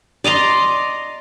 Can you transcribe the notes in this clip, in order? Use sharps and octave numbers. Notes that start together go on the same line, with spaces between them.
D5 D#5 A#5 C6